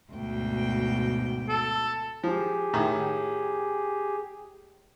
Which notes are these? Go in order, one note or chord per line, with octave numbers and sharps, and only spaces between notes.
D2 G#2 B2 G5
A4
F3 G4 G#4
A2 D#3